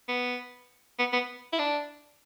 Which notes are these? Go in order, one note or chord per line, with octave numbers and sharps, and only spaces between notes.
B3
B3
B3
E4
D4